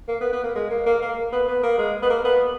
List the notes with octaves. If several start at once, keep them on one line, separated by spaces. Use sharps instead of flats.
A#3
B3
B3
A#3
G#3
A#3
A#3
A#3
B3
B3
A#3
G#3
B3
A#3
B3